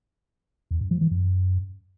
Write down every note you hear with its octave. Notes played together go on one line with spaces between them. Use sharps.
E2
G2
F3
E3
F#2